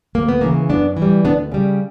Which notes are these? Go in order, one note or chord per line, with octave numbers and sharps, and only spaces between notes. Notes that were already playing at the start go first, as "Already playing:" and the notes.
D2 A#3
B3
C#3 E3 A#3
F#2 B3 D4
E3
G3
D2 B3 D4
C#3 G3